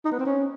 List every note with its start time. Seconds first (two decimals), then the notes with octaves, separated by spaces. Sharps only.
0.05 D#4
0.12 B3
0.19 C4
0.26 C#4